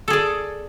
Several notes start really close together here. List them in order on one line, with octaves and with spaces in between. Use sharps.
A4 G#4 D5